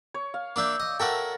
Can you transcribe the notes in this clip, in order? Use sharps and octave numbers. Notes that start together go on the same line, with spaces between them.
C#5
F5
A#3 D4 E5 D6 E6 G6
D#5
F#4 A4 A#4 E5 G5